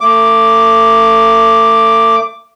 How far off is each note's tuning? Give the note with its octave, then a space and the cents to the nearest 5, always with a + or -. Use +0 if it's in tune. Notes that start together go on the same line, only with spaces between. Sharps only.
A3 +35 D6 +0